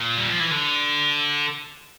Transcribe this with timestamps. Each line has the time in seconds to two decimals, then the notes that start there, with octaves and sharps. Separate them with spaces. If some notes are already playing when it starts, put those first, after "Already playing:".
Already playing: A#2
0.17 G3
0.29 F3
0.40 E3
0.51 D3